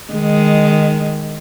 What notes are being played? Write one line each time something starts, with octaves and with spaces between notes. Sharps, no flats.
D#3 G#3